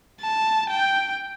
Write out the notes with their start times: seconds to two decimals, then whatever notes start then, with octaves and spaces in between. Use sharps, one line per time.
0.21 A5
0.70 G5